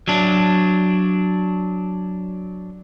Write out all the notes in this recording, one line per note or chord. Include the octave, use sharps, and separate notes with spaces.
F#3 D4